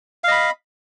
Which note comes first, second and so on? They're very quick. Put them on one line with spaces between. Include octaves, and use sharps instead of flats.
F5 D#5 B5